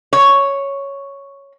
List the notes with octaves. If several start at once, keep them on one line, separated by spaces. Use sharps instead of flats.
C#5